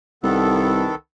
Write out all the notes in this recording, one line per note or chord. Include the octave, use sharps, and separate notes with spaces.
C2 D#3 B3 A4